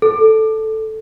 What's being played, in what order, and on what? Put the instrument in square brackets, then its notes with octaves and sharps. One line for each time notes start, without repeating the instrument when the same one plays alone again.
[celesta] A4